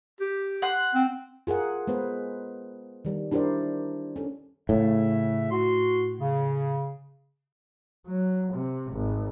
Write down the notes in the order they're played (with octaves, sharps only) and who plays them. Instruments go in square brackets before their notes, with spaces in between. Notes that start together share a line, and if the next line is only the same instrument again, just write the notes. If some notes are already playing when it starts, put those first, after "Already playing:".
[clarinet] G4
[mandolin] F#5 C6
[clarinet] C4
[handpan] F4 G#4 A#4 F#5
G#3 B3 B4 C5
D#3 G3
D4 E4 G4 A#4 C5 D5
C#4 A4
[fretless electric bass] A2 [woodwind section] C#3 E5
[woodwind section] F#4 C6
C#3
[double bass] F#3
C3
G#1